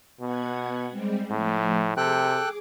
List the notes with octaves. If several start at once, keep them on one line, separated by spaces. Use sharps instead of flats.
B2 B3 F#5 G#6
G3 G#3 C4
A2 F3 A3
C3 G#4 A4 G5 D6 F#6